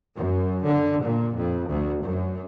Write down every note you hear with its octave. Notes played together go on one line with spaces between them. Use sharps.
F#2
D3
A#2
F2
D2
F#2